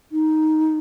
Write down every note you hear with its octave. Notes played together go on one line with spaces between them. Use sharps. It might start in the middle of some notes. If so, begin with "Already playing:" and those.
D#4